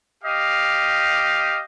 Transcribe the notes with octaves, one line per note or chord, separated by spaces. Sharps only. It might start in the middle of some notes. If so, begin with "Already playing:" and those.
G4 D#5 F5